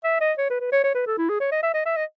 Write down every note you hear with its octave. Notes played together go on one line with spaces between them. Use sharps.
E5
D#5
C#5
B4
B4
C#5
C#5
B4
A4
E4
G#4
C#5
D#5
E5
D#5
E5
D#5